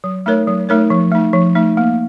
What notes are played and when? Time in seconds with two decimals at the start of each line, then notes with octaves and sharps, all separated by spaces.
0.04 F#3
0.26 A3 D#4 A#4 C#5
0.47 F#3
0.69 A3 D#4 A#4 C#5
0.90 F3
1.12 A3 D#4
1.33 F3
1.55 A3 D#4
1.77 A#3